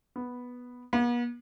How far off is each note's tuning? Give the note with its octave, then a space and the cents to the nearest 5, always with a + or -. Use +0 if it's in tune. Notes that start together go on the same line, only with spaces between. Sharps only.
B3 -5
B3 -45